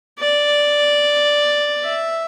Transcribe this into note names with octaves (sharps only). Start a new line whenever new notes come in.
D5
E5